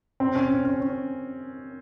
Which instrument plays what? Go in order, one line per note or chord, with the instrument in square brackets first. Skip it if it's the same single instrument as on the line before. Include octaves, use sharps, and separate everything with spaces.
[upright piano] C4
C#4
C#4
C#4
C#4